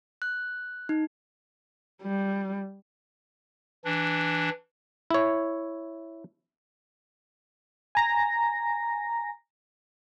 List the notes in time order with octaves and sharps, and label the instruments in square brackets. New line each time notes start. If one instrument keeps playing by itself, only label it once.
[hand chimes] F#6
D#4
[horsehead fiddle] G3
[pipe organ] E3 D4
[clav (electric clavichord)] E4 C#5
[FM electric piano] G#5 A#5 A#6